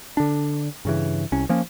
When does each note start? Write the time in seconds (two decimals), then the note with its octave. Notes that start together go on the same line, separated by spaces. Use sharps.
0.17 D3 D4
0.85 G2 C#3 E3
1.32 C2 C#4
1.49 F3 A#3 C#4